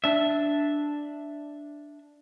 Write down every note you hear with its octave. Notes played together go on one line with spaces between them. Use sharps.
D4 E5